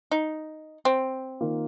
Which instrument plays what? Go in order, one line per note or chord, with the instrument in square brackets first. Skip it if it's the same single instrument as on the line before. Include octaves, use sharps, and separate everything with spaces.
[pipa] D#4
C4
[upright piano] D#3 A#3 F4